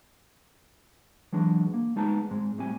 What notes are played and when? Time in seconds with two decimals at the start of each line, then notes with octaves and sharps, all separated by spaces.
1.33 E3 F#3 G#3 D4
1.74 A#3
1.96 G#3 B3 D#4 G#4 A5
2.31 G#2 G#3 C4
2.58 A2 G3 C4 G#5